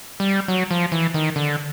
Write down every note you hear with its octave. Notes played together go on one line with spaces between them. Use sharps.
G3
F#3
F3
E3
D#3
D3